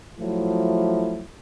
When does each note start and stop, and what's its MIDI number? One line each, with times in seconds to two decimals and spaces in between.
0.19 1.24 53
0.19 1.24 54
0.19 1.24 57
0.19 1.24 64